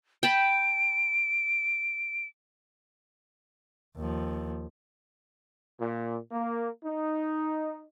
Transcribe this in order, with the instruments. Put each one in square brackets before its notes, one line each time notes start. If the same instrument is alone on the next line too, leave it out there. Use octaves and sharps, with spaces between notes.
[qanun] G5 A5 B5 [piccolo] D7
[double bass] D#2 F3
[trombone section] A#2
A#3
D#4